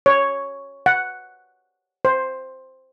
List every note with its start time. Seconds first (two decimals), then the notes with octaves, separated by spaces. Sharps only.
0.06 C#5
0.86 F#5
2.05 C5